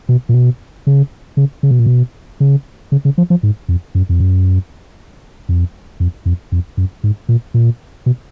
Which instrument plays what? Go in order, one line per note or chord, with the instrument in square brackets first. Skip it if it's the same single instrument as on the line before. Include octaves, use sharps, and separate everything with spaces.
[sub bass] B2
A#2
B2
C#3
C#3
C#3
B2
A#2
B2
C#3
C#3
C#3
F3
F3
G#2
F2
F#2
F2
F#2
F2
F2
F2
F2
F#2
G#2
A#2
A#2
B2